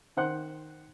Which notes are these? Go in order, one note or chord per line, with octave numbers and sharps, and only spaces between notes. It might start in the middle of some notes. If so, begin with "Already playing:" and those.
D#3 C5 F#5 C6 F#6